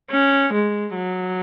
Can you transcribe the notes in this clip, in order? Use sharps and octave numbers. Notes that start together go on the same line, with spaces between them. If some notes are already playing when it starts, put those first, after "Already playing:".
C#4
G#3
F#3